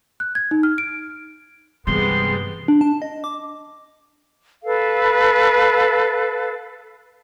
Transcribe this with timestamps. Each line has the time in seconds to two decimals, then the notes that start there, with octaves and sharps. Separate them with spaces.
0.20 F#6
0.35 G#6
0.51 D#4
0.63 F6
0.78 D7
1.87 G2 C3 E3 G3 G#3 B3 C6
2.68 D4
2.81 A5
3.02 D#5
3.24 D6
4.64 A4 B4 F5